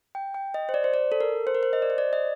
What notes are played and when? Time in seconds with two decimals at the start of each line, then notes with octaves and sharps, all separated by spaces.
0.15 G5
0.34 G5
0.54 D#5
0.69 C5
0.74 D5
0.84 C5
0.94 D5
1.12 A4
1.20 A#4
1.47 C5
1.55 A#4
1.63 C5
1.73 D#5
1.82 D5
1.90 C5
1.98 D5
2.13 D#5